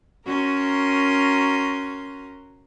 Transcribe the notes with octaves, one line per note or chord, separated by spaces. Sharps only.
C#4 F#4 A#4 A#5 C6